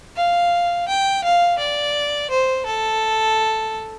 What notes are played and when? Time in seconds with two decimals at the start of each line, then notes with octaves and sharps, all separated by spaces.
0.16 F5
0.88 G5
1.24 F5
1.59 D5
2.30 C5
2.66 A4